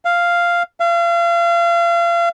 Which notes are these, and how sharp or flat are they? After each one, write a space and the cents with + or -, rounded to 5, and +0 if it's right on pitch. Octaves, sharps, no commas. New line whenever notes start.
F5 -5
F5 -35